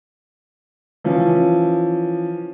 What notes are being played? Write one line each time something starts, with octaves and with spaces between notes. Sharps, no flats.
E3 F3 C#4